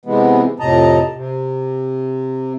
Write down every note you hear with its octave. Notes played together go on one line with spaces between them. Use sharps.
C3 E3 G#3 B3
F2 A2 C3 D#5 A5 A#5
C3